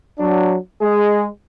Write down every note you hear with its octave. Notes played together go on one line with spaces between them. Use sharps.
F#3 D4
G#3 G#4